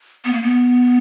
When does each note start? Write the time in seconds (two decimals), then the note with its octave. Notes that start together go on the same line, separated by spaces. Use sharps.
0.25 B3
0.33 A#3
0.42 B3